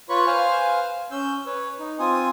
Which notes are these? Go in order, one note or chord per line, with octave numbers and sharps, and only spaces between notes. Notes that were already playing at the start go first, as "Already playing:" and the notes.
F4 B4 C#5 B5 C#6
B4 C5 F5 G#5 F6
C#4 E6 G6
B4 C#5
D#4
C4 F4 G#5 D#6